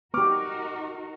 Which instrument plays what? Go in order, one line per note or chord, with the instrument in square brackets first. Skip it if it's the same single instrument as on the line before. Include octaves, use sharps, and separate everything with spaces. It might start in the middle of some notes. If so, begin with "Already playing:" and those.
[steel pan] B3 G4 [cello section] D#4 F#4 A#4 [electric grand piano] C#6 D6 F6